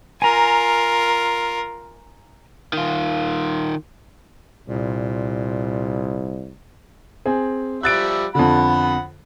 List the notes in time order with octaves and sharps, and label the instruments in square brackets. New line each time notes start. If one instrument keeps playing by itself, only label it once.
[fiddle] F4 A#4 [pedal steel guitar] G#5 A#5
[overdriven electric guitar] D#3 F4
[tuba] C2 [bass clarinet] A#2
[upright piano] C4 G#4
[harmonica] F3 G3 E5 [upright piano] F#6 A6 D7
[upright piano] F2 D3 [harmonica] F#5 B5